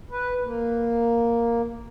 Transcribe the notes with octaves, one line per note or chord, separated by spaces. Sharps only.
B4
A#3